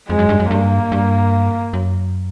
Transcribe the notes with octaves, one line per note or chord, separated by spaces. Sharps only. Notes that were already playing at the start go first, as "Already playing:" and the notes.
F2 G#3
F#2
G2
F#2
G2 A#3
G2
F#2